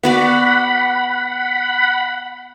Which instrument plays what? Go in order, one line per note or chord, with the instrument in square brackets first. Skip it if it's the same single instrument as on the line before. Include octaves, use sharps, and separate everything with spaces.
[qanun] B3 F#4 D5 [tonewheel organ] F#5 B5